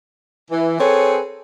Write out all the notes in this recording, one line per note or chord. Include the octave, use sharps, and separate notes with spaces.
E3
C4 G#4 A4 B4 C#5